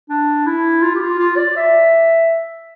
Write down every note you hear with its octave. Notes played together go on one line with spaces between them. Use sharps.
D4
E4
F4
G4
F4
F4
D5
E5